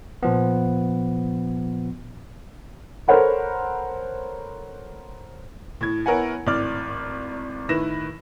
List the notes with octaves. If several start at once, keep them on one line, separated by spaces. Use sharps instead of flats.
A#2 F3 B3
A4 A#4 C5 C#5 F#5 B5
A2 G#6
B3 E4 A#4 C#5 F#5 G#5
G#1 A2 D5 F6
A2 D#3 E4 B4 A#6 E7